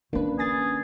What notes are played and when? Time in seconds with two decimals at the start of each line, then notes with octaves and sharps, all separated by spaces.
0.13 D#3 A#3 C#4 D4 B4
0.39 G#4 G#5 A6